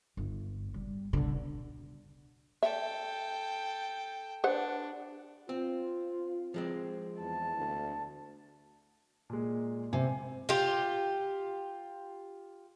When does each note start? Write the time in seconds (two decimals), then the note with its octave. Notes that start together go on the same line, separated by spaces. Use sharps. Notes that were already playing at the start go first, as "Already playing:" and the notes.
0.17 G1
0.74 G3
1.13 B2 D3
2.63 A4 E5 G5
4.44 D4 B4 C5 F#5
5.49 C4 F4
6.54 F3 G#3 C4
7.20 E2 A5
7.57 D2
9.30 A#2 G#3
9.93 C3 G#5
10.49 F4 G4